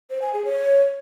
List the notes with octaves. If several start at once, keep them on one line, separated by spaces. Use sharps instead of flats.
C5
G#5
G#4
C#5